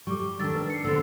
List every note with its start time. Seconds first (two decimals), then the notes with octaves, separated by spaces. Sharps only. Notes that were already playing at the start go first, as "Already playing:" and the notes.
0.07 G3 C#6 D6
0.40 D#3 D4 A4 E6 A6
0.55 B4
0.70 C7 C#7
0.84 D3 B3 C5 E6 A6